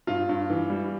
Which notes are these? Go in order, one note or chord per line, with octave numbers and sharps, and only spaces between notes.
G2 F4
G2
E3
G3